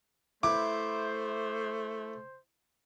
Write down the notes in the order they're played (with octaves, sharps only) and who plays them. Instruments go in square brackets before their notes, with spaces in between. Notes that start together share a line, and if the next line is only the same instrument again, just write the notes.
[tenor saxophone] A3 [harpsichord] E4 B4 [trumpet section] C5 [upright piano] D6